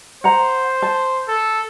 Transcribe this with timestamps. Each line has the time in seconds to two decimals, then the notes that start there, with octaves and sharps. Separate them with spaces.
0.24 C5 F#5 A#5
0.82 A5
1.28 A4